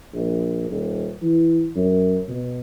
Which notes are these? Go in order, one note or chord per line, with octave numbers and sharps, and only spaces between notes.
A#1
D#1
E3
F#2
B2